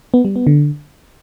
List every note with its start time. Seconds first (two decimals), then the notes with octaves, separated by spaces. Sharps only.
0.14 B3
0.25 G3
0.36 B3
0.47 D3